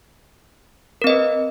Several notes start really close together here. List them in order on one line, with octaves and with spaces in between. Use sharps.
A#4 C4 D#5 B4